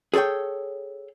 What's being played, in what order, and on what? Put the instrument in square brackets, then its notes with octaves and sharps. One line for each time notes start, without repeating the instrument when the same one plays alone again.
[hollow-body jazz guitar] G#4 A4 C5 C#5 G5